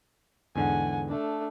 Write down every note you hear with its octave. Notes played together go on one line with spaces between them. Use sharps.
E2 G#2 D3 F#5 G#5
A3 D4